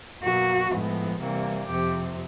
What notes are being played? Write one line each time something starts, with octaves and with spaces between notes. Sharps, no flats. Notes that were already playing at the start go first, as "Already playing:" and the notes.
B2 F#3 A#3 F#4
A2 F3 G#3 B3
C3 E3 G3 A#3
F2 C3 F3 G4